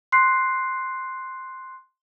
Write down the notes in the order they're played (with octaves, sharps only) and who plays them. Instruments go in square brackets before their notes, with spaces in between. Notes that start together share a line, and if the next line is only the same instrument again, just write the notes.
[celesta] C6 F#6 C7